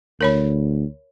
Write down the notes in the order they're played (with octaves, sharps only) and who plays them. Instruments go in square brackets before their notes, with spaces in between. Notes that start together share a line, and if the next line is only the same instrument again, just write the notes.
[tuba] D2 [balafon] A#4 C#5 B5